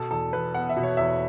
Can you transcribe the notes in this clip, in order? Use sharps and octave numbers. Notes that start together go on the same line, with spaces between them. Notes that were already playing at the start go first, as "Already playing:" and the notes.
Already playing: B2 A4
E2 A4
E2 B4
B3 F#5
E5
B2
C#5
E2 E5